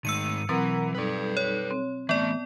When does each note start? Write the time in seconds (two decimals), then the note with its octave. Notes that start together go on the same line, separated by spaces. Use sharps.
0.05 G#2 D#3 A3 E6 C#7 D#7
0.49 B2 E3 F#3 C4 A#4 F#5 A#5
0.95 G3 D#4 A4 B4 D5
1.37 C#5
1.71 C4
2.09 E3 A3 B3 D5 A5